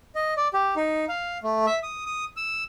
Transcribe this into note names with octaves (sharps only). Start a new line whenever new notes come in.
D#5
D5
G4
D#4
F5
A3
E5
D#6
D#6
E6